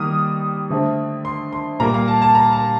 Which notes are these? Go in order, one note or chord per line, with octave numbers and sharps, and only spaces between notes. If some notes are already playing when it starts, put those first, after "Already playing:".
Already playing: D#3 G3 A#3 D#6 F6
D3 A3 C4
C6
C6
A#2 G3 A#3 A#5
F5
A5
A5
A#5
A5